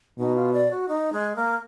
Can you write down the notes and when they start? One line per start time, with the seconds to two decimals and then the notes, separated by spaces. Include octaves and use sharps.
0.19 B2 D#4
0.36 F4
0.53 D5
0.71 F#4
0.88 D#4
1.12 G#3
1.36 A#3